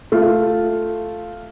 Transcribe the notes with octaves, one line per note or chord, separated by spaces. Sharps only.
A3 F4